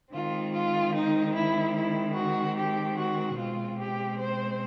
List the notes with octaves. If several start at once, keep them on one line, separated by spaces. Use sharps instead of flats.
D#3 G#3 C4 F4
F4
D#4
E4
E4
F#4
G4
F#4
B2 G#3 C4 F4
G4
C5